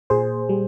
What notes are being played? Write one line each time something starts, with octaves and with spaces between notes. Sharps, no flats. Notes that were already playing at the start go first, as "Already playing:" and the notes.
A#2 G#4 C5
G3